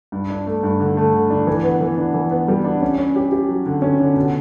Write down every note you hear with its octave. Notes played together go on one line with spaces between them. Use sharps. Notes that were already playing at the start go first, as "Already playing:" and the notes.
G2
D4
A3
G2
D3
A3
D3
D4
E3
B3
E3
D4
E3
B3
G3
D4
C#4
C#4
G4
G4
F#3
D3
C#4
D3
B2